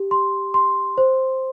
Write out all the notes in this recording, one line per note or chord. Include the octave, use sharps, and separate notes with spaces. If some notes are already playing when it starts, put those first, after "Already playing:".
Already playing: G4
C6
C6
C5